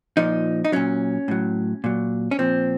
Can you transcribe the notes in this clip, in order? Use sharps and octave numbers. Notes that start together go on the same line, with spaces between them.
A#2 F3 D#4
D#4
A#2 F#3 C#4
A2 F#3
A#2 F#3
C#4
A#2 F3 C4